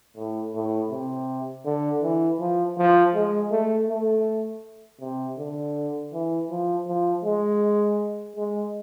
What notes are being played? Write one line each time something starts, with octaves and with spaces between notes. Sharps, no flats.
A2
A2
C3
D3
E3
F3
F3
G#3
A3
A3
C3
D3
E3
F3
F3
G#3
G#3